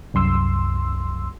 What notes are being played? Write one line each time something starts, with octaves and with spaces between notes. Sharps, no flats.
C2 F#2 C6 E6